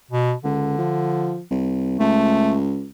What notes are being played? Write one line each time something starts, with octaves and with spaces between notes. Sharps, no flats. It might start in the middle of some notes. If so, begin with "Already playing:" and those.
B2
C#2 D3
F3
C2
C#2 A3